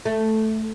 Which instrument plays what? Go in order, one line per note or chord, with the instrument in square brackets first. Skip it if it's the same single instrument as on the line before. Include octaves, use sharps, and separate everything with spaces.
[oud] A3